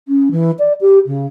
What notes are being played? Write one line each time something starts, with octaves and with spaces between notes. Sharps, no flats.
C#4
E3
D5
G4
C#3